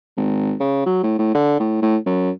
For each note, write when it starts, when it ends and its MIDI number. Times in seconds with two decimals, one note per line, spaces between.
0.17 0.54 32
0.60 0.83 49
0.86 1.01 54
1.03 1.16 45
1.19 1.32 45
1.34 1.57 50
1.60 1.81 45
1.82 1.96 45
2.06 2.31 42